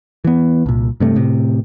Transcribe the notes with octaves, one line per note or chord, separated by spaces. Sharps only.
E3 B3
C2 A#2
G2 C3 A3
A2 C3